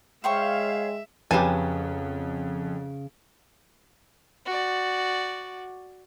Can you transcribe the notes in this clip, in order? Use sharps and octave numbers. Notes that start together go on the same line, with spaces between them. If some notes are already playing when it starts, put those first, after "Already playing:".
G#3 C5 C#5 E5 F5 G5 C#6
F2 C#3 F#3 G4 B4 G#5 A5
F#4 D5